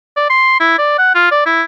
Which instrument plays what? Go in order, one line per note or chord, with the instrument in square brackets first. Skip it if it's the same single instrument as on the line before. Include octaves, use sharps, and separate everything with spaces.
[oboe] D5
C6
E4
D5
F#5
F4
D5
E4